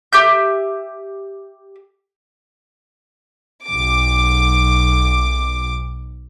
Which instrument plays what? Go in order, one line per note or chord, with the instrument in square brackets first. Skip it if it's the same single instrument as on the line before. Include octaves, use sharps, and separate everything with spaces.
[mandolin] G4 E5 G6
[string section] B1 D6